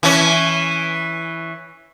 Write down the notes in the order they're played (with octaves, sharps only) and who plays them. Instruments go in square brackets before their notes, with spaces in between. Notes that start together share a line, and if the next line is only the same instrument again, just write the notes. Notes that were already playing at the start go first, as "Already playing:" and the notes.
[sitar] E3 C#4